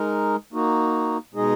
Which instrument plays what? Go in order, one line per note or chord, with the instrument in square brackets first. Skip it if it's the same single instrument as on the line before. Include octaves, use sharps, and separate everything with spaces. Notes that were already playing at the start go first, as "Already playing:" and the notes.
Already playing: [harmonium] G#3 D#4 A#4
A#3 D#4 F#4
B2 G#3 D#4 G#4 D#5